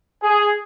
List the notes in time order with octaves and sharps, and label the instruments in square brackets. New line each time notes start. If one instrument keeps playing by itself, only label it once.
[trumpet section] G#4